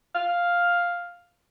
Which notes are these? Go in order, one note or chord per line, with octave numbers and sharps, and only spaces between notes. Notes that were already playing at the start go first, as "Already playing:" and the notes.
F5